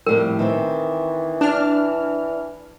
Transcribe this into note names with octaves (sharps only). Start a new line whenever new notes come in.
F2 A2 G3 A#4
D#3 E3 C4
D4 A5 F6